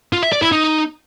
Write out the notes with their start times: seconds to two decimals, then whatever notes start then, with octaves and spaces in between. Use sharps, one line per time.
0.13 F4
0.23 E5
0.32 D5
0.42 E4
0.52 D#4